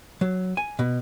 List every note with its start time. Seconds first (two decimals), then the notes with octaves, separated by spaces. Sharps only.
0.21 F#3
0.57 G#5
0.79 B2